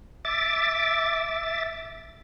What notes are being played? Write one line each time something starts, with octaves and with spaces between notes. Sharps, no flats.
E5 D6 A6